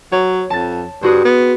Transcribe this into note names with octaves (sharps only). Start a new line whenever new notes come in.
F#3 C#5
F2 A5 A6
G2 C4 F#4 G#4
B3